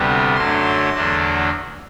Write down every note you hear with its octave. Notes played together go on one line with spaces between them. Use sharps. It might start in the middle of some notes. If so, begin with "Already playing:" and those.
Already playing: D2 C3 G3 B3
F#2 D3 F#3 A3 C6
E2 D3 F#3 A3 D4